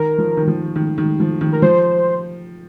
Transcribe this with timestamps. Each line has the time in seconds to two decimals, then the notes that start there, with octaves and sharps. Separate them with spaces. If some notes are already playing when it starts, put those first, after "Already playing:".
Already playing: D#3 A#4
0.18 F3
0.37 D#3
0.47 F3
0.76 D#3
0.98 D#3
1.20 F3
1.41 D#3
1.52 A#4
1.62 F3 C5